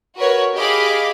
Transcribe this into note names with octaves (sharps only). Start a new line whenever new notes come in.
F#4 A#4 B4 C#5
G4 G#4 D#5 F5 B5 D6